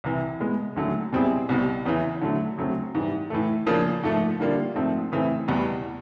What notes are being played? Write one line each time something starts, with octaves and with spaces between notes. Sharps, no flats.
C2 C3 E3
B2 G#3 B3
D#2 D3 F#3 A3 C#4
B2 G3 C4 E4 G#4
C2 B2 G3
E2 C#3 E3
D3 F#3 A3
D2 C#3 F#3 A3 C4
G#2 E3 G3
A2 E3 A3
C#3 F3 A#3 D4
G#2 F3 A3
D3 G3 A#3 D4 F4
G#2 F3 A3 C4
C#3 E3 A3 C4
E2 B2 G3 B3